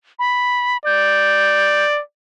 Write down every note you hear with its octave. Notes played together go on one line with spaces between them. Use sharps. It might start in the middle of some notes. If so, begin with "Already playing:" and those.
B5
D5 G6